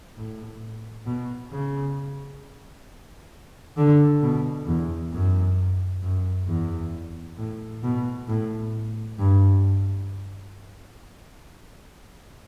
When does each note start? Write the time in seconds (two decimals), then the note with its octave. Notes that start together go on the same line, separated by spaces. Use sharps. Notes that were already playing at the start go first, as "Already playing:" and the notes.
0.16 A2
1.06 B2
1.51 C#3
3.77 D3
4.22 B2
4.67 E2
5.13 F#2
6.02 F#2
6.47 E2
7.37 A2
7.83 B2
8.28 A2
9.18 G2